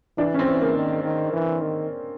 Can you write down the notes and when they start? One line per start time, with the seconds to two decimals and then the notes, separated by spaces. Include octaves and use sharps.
0.17 E3 D4
0.34 C#4
0.39 C4
0.47 E3
0.61 A#3
0.75 D#3
1.04 D#3
1.33 E3
1.62 D#3